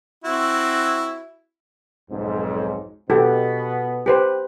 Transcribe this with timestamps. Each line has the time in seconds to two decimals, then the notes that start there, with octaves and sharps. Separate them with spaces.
0.24 C4 E4 F#4
2.11 B1 F2 G#2
3.10 B2 B3 F#4 G4 A4
4.06 G4 B4 C5